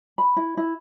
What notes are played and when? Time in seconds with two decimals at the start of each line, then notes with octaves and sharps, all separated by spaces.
0.18 B5
0.37 E4
0.57 E4